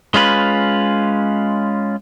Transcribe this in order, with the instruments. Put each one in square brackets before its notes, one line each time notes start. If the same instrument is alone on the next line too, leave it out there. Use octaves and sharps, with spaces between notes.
[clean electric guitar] G#3 C#4 F4 B4